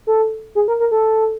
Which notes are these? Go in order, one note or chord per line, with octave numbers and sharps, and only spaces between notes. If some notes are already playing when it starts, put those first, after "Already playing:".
A4
G#4
A#4
A#4
A4